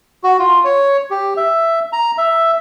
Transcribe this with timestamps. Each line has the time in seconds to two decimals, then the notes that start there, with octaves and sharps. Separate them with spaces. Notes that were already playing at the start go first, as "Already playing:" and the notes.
0.24 F#4
0.39 F4
0.65 C#5
1.11 G4
1.37 E5
1.93 A#5
2.18 E5